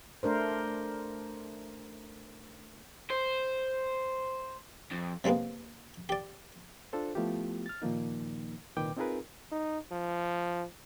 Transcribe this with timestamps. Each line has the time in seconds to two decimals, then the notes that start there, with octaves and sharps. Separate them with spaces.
0.23 A3 D4 A#4 C5
3.10 C5
4.91 F2
5.24 C3 F#3 G#3 A#3 B3
6.09 G4 D5
6.93 D4 F4 A4 C5
7.15 F3 A3 B3 E4 F4 G4
7.66 F6 A6
7.82 A#2 D#3 F3 A#3 D#4
8.77 C2 A#2 D#3 B4 G5 D6
8.97 C4 D#4 F4 G#4 A#4 B4
9.52 D#4
9.92 F3